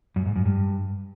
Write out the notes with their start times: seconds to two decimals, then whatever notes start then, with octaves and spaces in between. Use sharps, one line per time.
0.16 F#2
0.26 G#2
0.36 F#2
0.45 G2